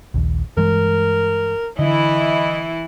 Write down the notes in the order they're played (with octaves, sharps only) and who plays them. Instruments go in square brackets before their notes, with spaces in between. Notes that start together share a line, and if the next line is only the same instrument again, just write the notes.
[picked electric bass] A#1 D#2
[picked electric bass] G2 E3 G#3 [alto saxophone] A#4
[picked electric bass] D3 [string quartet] E3 E4 [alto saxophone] D#5